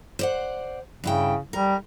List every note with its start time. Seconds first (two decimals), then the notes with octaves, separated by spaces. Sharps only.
0.19 C5 D5 F#5
1.04 G2 C#3 E4 G5
1.53 G3 A#4